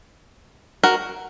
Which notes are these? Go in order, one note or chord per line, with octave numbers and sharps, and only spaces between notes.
F#4 A#4